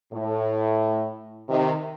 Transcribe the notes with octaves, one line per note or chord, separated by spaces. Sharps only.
A2
C3 D#3